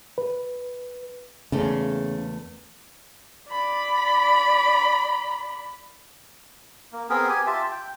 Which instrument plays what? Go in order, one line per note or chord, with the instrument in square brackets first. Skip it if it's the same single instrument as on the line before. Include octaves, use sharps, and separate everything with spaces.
[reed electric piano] B4
[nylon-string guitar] E2 A3 A#3 [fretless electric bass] C#3
[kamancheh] D5 B5
[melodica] A#3
B3 C4 G#4 A#4
G4 G#5
F4 G4 E5 A5
G5